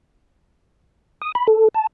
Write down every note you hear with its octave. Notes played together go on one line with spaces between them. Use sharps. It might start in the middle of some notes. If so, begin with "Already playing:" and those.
D#6
B5
A4
A5